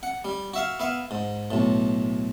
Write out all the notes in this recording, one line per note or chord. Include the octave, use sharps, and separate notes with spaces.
F#5
G3
F#4 E5 F5
B3 E5 F5
G#2
B1 A2